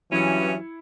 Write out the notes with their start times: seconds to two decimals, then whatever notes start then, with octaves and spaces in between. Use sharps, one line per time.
0.12 G2 E3 F#3 C#4 E4 G#6 C#7